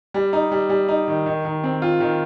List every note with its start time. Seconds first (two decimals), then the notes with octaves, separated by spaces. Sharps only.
0.14 G3
0.33 D#4
0.52 G3
0.69 G3
0.89 D#4
1.08 D#3
1.26 D#3
1.45 D#3
1.64 C4
1.82 F4
2.00 D#3